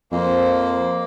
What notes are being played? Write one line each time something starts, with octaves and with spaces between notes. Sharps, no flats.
F2 A#3 C5